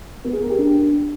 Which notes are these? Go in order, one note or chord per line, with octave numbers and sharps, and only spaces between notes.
B3
G#4
A#4
G4
D4